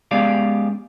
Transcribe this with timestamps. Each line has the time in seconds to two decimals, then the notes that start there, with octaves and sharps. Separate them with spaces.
0.11 G#3 B3 C#4 G4 D5 F5